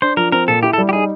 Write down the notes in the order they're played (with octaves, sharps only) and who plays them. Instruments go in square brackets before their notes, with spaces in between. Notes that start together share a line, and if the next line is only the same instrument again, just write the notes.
[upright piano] D4 [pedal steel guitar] C5
[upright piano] F3 [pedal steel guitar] A#4
[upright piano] C4 [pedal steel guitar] A#4
[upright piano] A#2 [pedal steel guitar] A4
[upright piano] E4 [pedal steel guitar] G4
[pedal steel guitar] A4
[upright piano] G3
[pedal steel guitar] G4
[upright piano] D#4 [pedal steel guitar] G#4